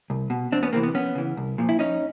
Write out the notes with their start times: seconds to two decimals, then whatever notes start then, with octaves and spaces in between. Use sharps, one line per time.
0.10 C2
0.30 B2
0.52 E2 C4 D4
0.63 B3 C#4
0.73 C3 E3 A#3 C4
0.83 B3
0.94 F2 B3 C#4
1.15 C#3 E3
1.37 C2
1.58 A#2 F3
1.69 E4
1.79 F2 C#4 D#4